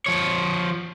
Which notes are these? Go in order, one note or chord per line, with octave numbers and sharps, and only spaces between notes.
F3 C#5